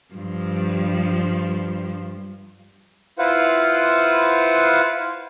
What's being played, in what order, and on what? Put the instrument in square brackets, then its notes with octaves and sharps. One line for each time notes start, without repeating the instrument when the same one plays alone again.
[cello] G2 F3
[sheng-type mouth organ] E4 F4 B4 C5 F5 F#5